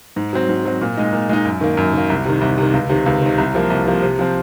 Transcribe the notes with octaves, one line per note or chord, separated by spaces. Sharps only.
G#2
F#3 C4
G#2
F#3 C4
A#2
G#3 D#4
A#2
G#3 D#4
F#2
D#3 A#3
F#2
D#3 A#3
C2
C3 D#3
C2
C3 D#3
C#2
C3 D#3
C#2
C3 D#3
C2
C3 F3 A#3
C2
C3 F3 A#3
C3
F3 C4